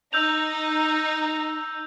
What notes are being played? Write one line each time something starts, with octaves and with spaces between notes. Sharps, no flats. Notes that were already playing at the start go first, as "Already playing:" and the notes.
D#4 E6 G6 F7